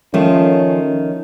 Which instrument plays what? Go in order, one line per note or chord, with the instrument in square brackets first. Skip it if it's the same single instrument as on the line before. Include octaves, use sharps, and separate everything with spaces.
[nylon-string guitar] D#3 A3 [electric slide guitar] F3 F4 [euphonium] C#4